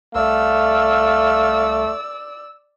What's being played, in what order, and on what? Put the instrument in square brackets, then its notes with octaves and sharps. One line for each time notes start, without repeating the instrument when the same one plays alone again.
[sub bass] C2 [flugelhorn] A3 [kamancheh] D5 E6 [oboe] F5